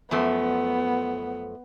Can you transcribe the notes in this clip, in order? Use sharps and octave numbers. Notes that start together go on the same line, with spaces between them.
F#2 F3 A3 B3